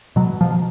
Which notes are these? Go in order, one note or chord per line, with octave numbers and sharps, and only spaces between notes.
B2 F#3
F3